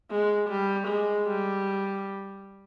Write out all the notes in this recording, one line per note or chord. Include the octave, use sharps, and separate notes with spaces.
G#3
G3
G#3
G3